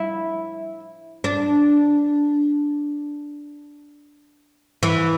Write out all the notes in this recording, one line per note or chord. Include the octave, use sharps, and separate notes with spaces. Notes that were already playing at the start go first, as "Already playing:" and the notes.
Already playing: E4
D4
E3